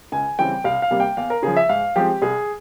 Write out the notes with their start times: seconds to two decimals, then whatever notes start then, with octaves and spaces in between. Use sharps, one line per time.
0.12 C#2 G#5
0.39 C#3 E3 G3 C4 G5
0.64 C2 F5
0.82 F5
0.91 C3 G3 A#3
1.00 G5
1.17 E2 F5
1.30 A#4
1.43 C#3 F3 G#4
1.57 E5
1.69 G#2 F5
1.96 F3 G#3 C4 G4
2.22 C2 G#4